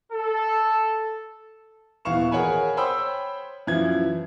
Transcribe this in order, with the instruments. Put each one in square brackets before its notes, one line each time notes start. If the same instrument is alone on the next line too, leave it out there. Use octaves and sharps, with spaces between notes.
[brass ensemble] A4
[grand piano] D#1 E3 B3 F5 C#6 E7
G#4 A#4 C#5 F#5 G#5 B5
C5 C#5 G5 B5 D#6 E6
F#2 E3 F3 E5 G#6